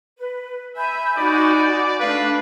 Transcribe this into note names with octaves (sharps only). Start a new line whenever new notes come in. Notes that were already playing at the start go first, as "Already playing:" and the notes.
B4
E5 G#5 B5 G6
D#4 F#4 D5
A3 D4 B4 F5